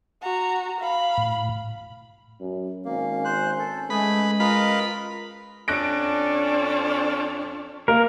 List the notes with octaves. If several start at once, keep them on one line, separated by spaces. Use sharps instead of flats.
F#4 A#5
F5 B5
A2
F#2
G#1 A#3 C#4
C5 F#6
A4
G#3 A3 G#4 B4 B5
F4 A#4 B4 D#5 B5
F2 C#4 D4 F#6 A#6 D7
A#3 A#4